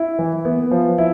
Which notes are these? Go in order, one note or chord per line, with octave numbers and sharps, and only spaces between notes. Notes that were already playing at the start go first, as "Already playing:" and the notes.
Already playing: E4
E3
B3
F3
E4